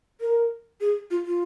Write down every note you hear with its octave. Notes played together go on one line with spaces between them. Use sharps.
A#4
G#4
F4
F4